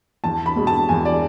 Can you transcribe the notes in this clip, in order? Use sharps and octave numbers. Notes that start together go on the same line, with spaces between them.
E2 A5
B5
B2 G#3
A5
E2 G#5
D5